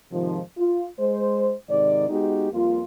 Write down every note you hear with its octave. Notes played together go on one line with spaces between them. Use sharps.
G#2 C3 D#3 F3
F4
G#3 C5
G#2 C3 D#3 D5
G#3 B3 D#4 F#4 G4
F2 G3 A#3 F4